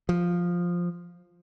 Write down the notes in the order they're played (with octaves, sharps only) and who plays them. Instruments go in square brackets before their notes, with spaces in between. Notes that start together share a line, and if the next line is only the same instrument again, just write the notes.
[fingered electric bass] F3